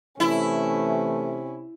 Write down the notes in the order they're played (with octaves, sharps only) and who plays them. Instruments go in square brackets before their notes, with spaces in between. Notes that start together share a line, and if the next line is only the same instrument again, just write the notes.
[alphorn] C3 [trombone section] E3 A3 [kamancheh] C#4 [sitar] E4